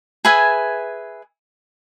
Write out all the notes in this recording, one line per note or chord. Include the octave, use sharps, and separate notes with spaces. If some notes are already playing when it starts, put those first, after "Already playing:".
G#4 B4 E5 G#5